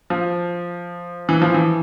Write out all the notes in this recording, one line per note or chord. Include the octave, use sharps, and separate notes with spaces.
F3
E3
F3
E3